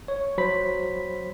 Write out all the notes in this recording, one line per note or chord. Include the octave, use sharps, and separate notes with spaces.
C#5
F#3 C5 B5 B6